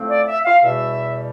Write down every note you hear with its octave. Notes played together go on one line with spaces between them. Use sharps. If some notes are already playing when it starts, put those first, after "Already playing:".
Already playing: A2 F3 A3 C4
D5
E5
F5
E2 B2 G3 E5